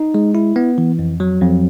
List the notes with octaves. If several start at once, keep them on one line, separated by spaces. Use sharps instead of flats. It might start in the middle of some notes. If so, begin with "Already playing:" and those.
Already playing: D#4
G#3
E4
B3
E3
F2
F#3
F2